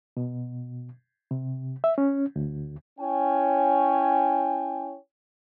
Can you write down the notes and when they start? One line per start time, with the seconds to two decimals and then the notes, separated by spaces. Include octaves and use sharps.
0.17 B2
1.31 C3
1.84 E5
1.98 C#4
2.36 D2
2.99 C#4 E4 C#5 G5 G#5